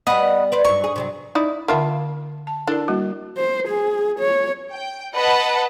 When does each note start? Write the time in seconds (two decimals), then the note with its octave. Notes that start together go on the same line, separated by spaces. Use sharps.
0.07 G3 B3 D#5 F#5 B5
0.52 B4 C5 D5
0.65 G2 F#3 C#6
0.84 G#4
0.96 C3 F#3 G3
1.35 D#4 E4 D5
1.68 D3 A#3 F4 E5 F#5 A5
2.47 A5
2.67 D4 E4 A4 A#4 D5
2.88 G3 A#3 F#4
3.38 C5
3.68 G#4
4.19 C#5
4.71 G5
5.14 B4 D#5 F#5 A5 B5